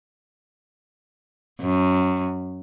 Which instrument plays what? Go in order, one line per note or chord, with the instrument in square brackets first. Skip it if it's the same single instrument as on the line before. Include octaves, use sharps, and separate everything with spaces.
[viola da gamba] F#2